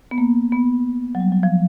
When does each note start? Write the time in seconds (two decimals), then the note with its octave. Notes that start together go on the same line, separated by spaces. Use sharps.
0.11 B3
0.18 A#3
0.52 B3
1.15 F#3
1.20 G3
1.32 F#3
1.43 F3